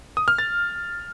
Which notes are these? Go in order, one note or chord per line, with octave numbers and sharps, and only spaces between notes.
D#6
F6
A6